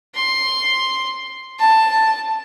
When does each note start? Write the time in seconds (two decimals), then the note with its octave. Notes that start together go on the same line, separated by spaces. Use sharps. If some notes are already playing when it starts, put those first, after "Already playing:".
0.15 C6
1.59 A5